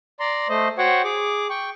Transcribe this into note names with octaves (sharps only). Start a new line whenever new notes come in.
D5 A#5 C6
A3 C5 D#5
F#4 C5 C#5 F#5 G5 C#6
G#4 D6
G5 C#6